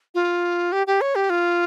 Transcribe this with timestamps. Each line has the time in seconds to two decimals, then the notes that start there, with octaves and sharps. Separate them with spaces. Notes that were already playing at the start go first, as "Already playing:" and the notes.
0.15 F4
0.72 G4
0.87 G4
1.01 C#5
1.15 G4
1.30 F4